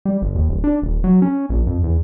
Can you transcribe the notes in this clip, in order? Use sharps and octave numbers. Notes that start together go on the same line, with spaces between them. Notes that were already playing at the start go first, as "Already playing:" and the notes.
G3
G1
D#2
D1
D4
D#1
F#3
C#4
A#1
F2
E2